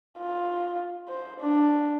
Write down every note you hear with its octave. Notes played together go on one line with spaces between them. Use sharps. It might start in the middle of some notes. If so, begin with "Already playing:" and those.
F4
C5
D4